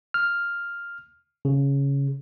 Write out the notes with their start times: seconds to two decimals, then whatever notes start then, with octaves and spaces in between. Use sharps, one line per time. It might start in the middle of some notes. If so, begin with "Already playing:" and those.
0.14 F6
1.45 C#3